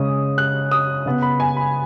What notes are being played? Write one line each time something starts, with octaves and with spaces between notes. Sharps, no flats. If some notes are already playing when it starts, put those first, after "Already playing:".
Already playing: C#3 G#3 C#4 D#6
F#6
D#6
C#3 B3
B5
G#5
B5